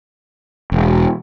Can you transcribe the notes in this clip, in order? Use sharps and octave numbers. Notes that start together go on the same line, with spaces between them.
E1